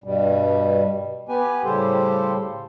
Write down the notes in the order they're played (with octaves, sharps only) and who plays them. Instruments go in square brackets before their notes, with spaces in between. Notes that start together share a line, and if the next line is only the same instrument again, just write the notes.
[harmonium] G2 B2 G3
B3 G4 B4 G#5
A2 C#3 G3 G4 A4 C5